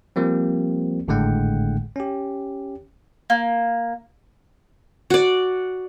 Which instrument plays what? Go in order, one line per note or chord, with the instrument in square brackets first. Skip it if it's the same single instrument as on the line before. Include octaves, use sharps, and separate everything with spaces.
[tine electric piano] F3 G3 A#3 C4
G#1 A2 D3 G#3 F#5 G5
C#4 G4
[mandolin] A#3
[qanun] F#4 D5